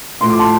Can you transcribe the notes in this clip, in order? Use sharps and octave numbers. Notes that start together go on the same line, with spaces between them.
A2 F3 A3 C6
D6
A5 C6